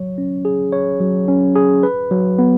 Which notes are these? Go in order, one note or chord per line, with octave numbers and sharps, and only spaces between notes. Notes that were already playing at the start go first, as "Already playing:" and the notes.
Already playing: F#3 C#5
C#4
G#4
C#5
F#3
C#4
G#4
B4
F#3
B3